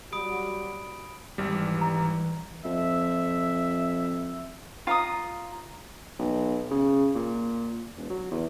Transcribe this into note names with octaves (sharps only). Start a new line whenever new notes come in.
F#3 G3 F#4 B5 D#6 D7
G#1 E3 G3
A#5
F2 E5
F4 A#5 D#6
B1
C#3
A#2
E1
F#3
E2